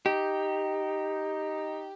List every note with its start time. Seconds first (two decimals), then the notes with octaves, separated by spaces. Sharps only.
0.06 D#4 G4